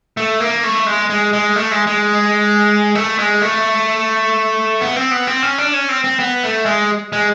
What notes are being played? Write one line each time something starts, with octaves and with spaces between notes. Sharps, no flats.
A3
A#3
A3
G#3
G#3
G#3
A3
G#3
G#3
A3
G#3
A3
B3
C4
B3
C4
C#4
D4
C#4
C4
C4
B3
A3
G#3
G#3